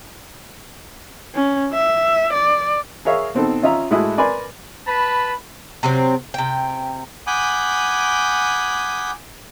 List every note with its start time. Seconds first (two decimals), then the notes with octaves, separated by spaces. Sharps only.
1.35 C#4
1.73 E5
2.33 D5
3.05 G#4 A#4 C#5 E5 F5
3.34 B2 C4 D#4 A4
3.63 C#4 F4 D#5 E5 A#5
3.91 A2 G#3 E4 F#4 A4 D#6
4.17 A#4 B4 D5 G#5 B5 C6
4.86 B4 A5 B5
5.83 C3 F#3 C4
6.34 C3 G5
7.27 F#5 G#5 B5 D6 D#6 G6